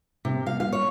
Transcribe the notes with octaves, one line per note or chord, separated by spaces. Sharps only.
C3
F5
F5
C#5